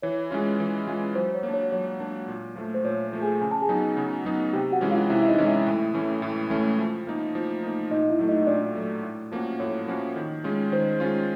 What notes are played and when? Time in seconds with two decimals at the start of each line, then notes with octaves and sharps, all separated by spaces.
0.02 E3 C#5
0.31 G#3 C#4 F4
0.60 E3
0.87 G#3 C#4 F4
1.15 F#3 C5
1.35 C#5
1.43 A#3
1.49 D4
1.54 C#5
1.72 F#3 C#5
2.00 A#3 D4
2.28 A#2
2.56 F3 A3
2.74 C5
2.85 A#2 C#5
3.13 F3 A3
3.22 G#4 G#5
3.41 C#3 G#5
3.51 A5
3.62 G#4 G#5
3.69 F#3 B3 D#4
3.97 C#3
4.25 F#3 B3 D#4
4.53 C3 G4 G5
4.72 F#4 F#5
4.81 E3 G#3 C#4
4.91 F4 F5
5.09 C3 E4 E5
5.23 E5
5.28 D#4 D#5
5.38 E3 G#3 C#4
5.47 E4 E5
5.67 A2
5.94 E3 A3 C#4
6.22 A2
6.50 E3 A3 C#4
6.78 F3
7.07 A#3 D#4
7.35 F3
7.63 A#3 D#4
7.90 A#2 D#4 D#5
8.10 E4 E5
8.19 F#3 A3
8.28 D#4 D#5
8.47 A#2 D4 D5
8.75 F#3 A3
9.03 A2
9.32 F3 A#3 C#4 F#4
9.59 A2 C#5
9.88 F3 A#3 C#4 F#4
10.16 D#3
10.44 G#3 C#4 F4
10.72 D#3 C5
11.00 G#3 C#4 F4